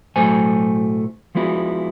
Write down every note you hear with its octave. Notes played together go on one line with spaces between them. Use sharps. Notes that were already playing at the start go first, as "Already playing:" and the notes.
B1 A2 F#3 A3 C5 G#5
F3 G#3 B3 E4 F#4